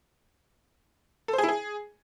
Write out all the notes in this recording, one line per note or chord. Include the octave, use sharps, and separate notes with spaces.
A4
C5
G#4
E4
G#4